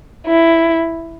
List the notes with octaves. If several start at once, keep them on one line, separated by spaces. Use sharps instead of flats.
E4